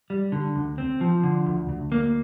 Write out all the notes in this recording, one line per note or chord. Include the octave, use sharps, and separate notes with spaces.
G3
D3
D2
C4
F3
D3
D2
D2
A#3